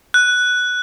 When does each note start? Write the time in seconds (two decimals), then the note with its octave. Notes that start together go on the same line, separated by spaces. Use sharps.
0.14 F#6